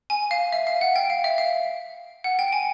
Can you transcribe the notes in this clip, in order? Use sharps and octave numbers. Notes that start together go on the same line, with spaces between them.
G#5
F5
E5
F5
F#5
G5
F5
E5
F5
F#5
G5
G#5